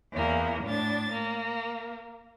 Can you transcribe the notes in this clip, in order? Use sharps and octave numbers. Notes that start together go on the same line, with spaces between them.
E2 A#3
A2 D4 A6
A#3